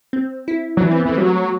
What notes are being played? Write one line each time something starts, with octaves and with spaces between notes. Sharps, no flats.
C4
E4
F#3
E3 D4
C4
B3
E3 A3
F#3 G3